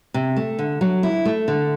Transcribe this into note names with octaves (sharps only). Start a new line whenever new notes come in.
C3
A3
D3
F#3
E4
A3
D3